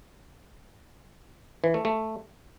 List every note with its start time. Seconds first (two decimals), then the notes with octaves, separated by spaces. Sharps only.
1.64 E3
1.74 A3
1.85 A3